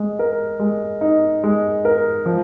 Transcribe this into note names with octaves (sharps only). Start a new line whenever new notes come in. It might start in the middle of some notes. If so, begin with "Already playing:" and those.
Already playing: G#3
A#4
G#3
D#4
G#3
A#4
F3